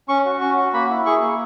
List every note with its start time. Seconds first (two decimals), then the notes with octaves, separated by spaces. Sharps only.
0.08 C#4 C#6
0.25 F#4
0.41 C#4 C#6
0.58 F#4
0.73 A#3 B5
0.90 E4
1.06 G#4 C#6
1.22 A#3